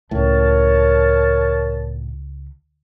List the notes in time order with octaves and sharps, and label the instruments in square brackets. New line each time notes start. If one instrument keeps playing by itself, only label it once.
[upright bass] C#2 [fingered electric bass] A2 [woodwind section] A#4 C#5 A5